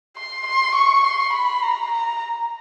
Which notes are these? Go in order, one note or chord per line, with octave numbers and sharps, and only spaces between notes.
C6
C6
C#6
C6
B5
A#5
A#5